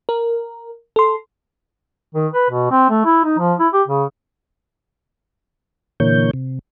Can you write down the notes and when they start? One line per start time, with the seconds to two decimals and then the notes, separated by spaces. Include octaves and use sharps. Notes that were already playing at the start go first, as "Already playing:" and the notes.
0.09 A#4
0.96 A4 C6
2.15 D#3
2.33 B4
2.50 B2
2.71 C4
2.90 A3
3.05 E4
3.24 D#4
3.38 F3
3.60 E4
3.74 G4
3.88 C#3
6.00 A#2 D3 E3 A#3 C#5 G6
6.33 C3